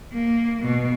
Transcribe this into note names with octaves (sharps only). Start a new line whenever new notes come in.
A#3
B2